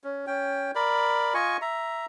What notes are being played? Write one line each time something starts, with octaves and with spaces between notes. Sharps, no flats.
C#4
C#4 G5
A#4 D5 B5
F4 D#5 G#5 C#6
E5 A#5